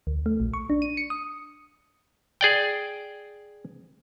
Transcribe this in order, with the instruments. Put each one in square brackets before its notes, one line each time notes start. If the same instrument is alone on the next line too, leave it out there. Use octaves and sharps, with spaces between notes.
[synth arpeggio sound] D2
A3
A#1
C#6
D4
D#7
C#7
D#6
[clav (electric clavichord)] G#4 D5 G5